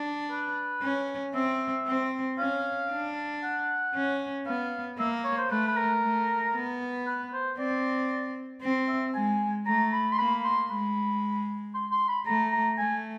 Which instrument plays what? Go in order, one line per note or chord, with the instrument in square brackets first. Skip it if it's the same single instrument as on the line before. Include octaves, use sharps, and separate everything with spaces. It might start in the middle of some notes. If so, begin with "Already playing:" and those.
Already playing: [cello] D4
[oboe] B4
[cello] C#4
[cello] C4 [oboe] E5
[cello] C4
[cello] C#4 [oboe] F5
[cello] D4
[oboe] F#5
[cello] C#4
[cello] B3 [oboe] F5
[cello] A#3 [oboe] E5
[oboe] C#5
C5
[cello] A3 [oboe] B4
[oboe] B4
A#4
[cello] A3
B3
[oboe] B4
C5
[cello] C4 [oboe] D5
[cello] C4
[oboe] E5
[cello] G#3 [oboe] G#5
[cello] A3 [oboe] A#5
[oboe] B5
C6
[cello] A#3 [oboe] B5
[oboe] C6
[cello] G#3 [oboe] B5
[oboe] C6
C6
B5
[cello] A3 [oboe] A#5
[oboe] A#5
[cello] A3 [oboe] G#5